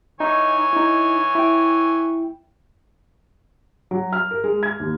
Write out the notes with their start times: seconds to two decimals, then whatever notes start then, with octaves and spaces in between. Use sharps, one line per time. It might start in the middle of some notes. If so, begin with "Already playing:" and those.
0.20 E3 D#4 C#5 G#5
0.73 D#4 E4
1.35 E4 G5
3.91 F#3
4.13 F6
4.31 A#4
4.44 G#3
4.63 G#6
4.80 D#2